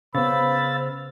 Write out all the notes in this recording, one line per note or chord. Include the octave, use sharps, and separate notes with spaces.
C#3 B3 C5 F5 B5 E6 A6